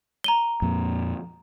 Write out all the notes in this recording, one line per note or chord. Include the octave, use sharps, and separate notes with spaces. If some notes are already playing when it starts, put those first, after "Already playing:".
A#5 D#7 G7
F2 A#2